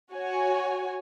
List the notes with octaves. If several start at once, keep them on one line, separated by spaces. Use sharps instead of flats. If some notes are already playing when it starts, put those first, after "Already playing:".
F#4 C#5 G#5